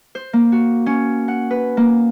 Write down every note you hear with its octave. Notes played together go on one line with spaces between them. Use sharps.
C5
A#3
F#4
C#4
F#5
B4
A#3